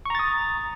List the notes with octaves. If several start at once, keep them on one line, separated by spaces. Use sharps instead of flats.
A#5 C#6 D#6 A6